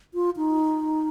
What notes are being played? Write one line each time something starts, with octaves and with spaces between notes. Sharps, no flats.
F4
D#4